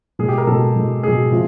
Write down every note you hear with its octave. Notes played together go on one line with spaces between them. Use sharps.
B2 G#3 G#4
G4
A#4
B2 G#3 A4
B2 G#3
B2 G#3 G#4
C3 F3 G#3